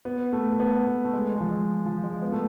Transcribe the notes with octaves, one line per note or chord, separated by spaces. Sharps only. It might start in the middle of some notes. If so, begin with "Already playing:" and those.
B3
A3
A3
B3
A3
A3
G#3
G#3
F3
F3
G#3
B3
A3